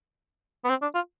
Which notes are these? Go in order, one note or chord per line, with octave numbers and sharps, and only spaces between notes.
B3
C4
D4
F4